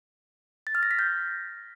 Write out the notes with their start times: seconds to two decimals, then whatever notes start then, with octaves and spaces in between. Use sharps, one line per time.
0.67 A6
0.75 F6
0.83 A#6
0.91 B6
0.99 G6